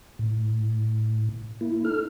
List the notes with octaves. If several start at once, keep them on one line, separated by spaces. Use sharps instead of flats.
A2
A#3 E4
D#4 A4 F6